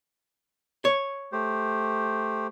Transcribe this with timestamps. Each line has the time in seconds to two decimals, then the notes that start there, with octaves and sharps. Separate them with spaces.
0.85 C#5
1.32 A3 G4 C5